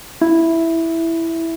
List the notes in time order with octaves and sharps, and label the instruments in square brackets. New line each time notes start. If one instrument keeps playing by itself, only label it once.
[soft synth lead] E4